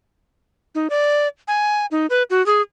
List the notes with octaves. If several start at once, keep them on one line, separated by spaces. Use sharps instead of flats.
D#4
D5
G#5
D#4
B4
F#4
G#4